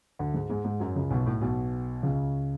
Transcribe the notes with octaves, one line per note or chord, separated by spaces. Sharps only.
D2 D3
G#2 G#3
G#2 G#3
G#2 G#3
F#2 F#3
C#2 C#3
B1 B2
A2
B1 B2
C#2 C#3